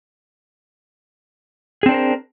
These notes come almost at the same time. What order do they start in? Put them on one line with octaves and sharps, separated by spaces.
G#4 C4 D4 C5 A#4